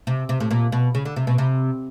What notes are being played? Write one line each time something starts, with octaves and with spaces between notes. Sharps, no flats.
C3
C3
A2
A#2
B2
C#3
D3
C3
B2
C3